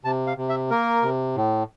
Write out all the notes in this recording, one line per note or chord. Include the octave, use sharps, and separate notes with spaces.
C3 A5
F5
C3
E5
A#3 A#4
C3
A2